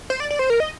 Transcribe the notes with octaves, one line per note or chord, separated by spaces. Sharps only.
C5
D5
D5
C5
A#4
D#5